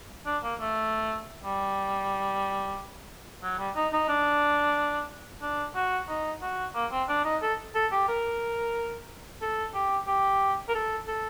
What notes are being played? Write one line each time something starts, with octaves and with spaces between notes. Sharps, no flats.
D4
A#3
A3
G3
F#3
G3
D#4
D#4
D4
D4
F#4
D#4
F#4
A#3
C4
D4
D#4
A4
A4
G4
A#4
A4
G4
G4
A#4
A4
A4